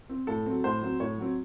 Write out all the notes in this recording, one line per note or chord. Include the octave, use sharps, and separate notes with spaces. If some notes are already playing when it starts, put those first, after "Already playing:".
C4
A2 A4
F#3 C4
A2 C5
F#3 C4
A2 C#5
F#3 C4